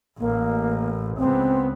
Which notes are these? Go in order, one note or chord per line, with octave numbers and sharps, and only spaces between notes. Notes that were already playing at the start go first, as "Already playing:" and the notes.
A1 A#3
C#2 B3 C4